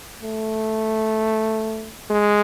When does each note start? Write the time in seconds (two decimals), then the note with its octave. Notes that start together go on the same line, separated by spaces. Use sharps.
0.23 A3
2.10 G#3